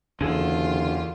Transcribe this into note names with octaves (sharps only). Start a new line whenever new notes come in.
F#1 E2 D3 F4 G#4 A4